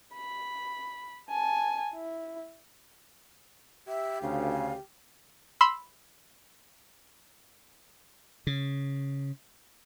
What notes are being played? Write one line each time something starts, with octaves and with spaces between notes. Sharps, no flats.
B5
G#5 A5
E4
G4 E5
D2 C#3 F5
B5 C6 E6
C#3